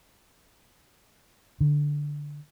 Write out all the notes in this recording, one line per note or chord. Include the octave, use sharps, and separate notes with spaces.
D3